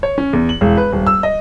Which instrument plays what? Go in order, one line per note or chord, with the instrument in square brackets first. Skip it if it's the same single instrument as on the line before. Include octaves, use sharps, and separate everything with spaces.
[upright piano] C#5
C#4
E2
F#7
E1
B4
D#1
E6
D#5